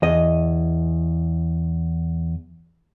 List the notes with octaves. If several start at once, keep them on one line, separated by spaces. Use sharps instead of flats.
E2 D#5